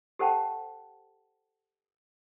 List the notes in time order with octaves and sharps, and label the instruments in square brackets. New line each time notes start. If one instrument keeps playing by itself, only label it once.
[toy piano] G4 A4 C5 F#5 G5 A5